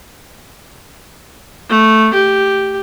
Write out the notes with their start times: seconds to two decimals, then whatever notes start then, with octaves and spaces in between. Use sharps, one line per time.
1.69 A3
2.14 G4